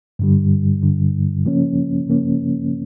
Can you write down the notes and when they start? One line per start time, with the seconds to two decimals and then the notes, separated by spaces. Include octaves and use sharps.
0.19 G2 D3 G3
0.82 G2 D3 G3
1.45 C#3 F3 A#3 C#4
2.08 C#3 F3 A#3 C#4